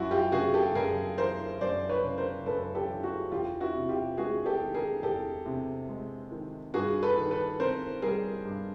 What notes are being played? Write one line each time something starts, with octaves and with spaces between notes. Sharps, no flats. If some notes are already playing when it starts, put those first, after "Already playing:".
Already playing: F#2 E4 F#4
F4 G4
C#3 F#4 G#4
G4 A4
F#2 G#4 A#4
E3 A#4 C5
F#2 C5 D5
B4 C#5
C#3
A#4 C5
F#2 A4 B4
G4 A4
E3
F#4 G#4
E2 F4 G4
E4 F#4
C3
F4 G4
G#3 F#4 G#4
G4 A4
D#3
G#4 A#4
E2 G4 A4
C3
G#3
D#3
G2 F#4 G#4
A4 B4
D#3
A4 B4
C4 A#4 C5
G3 G#4 A#4
G2